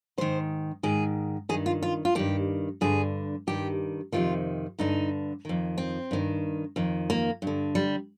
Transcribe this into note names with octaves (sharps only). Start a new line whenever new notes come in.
G#2 D#3 C5
G#2 D#3 G#4
G2 D#3 G#4
F4
F4
F4
G2 D#3 G4
G2 D3 G#4
G2 D#3 G4
F2 C3 D#3 F4
G2 D3 D#4
F2 D#3
C4
G2 D#3
F2 D#3
A#3
G2 D3
G3